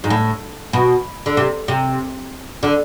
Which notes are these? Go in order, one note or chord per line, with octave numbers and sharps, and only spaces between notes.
G#2
A2
B2
D3
C3
C3
D3